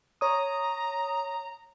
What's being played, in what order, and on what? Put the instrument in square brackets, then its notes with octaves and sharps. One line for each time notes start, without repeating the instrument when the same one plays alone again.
[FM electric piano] C#5 D#6 [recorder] A#5